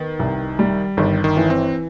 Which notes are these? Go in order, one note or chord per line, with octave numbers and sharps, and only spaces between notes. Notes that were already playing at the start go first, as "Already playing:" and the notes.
Already playing: D#3 B3
C2
G3
G1 D#3
D#3
E3
C4